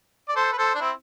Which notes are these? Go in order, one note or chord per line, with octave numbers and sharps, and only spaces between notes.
D5
A4 C5
B4
A4 C5
D4
C4 E4